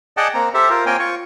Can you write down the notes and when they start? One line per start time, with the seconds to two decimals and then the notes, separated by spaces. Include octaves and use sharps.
0.17 G#4 D5 D#5 F#5 G5 A5
0.34 A#3 C4 A#5
0.54 G4 A4 C5 E5
0.70 F4 A#4 C5
0.86 A#3 C4 A#4 C#5 G5 G#5
0.99 F4 C#6